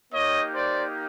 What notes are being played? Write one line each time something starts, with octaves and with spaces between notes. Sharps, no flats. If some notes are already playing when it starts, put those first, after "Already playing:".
A#3 D#4 G4 C#5 D#5
C5 D5